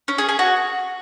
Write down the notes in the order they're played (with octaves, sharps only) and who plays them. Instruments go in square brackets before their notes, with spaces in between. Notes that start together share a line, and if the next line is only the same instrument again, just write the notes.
[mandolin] C#4
G#4
G#4
F#4